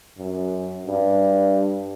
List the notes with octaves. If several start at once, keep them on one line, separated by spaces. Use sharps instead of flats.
F#2
G2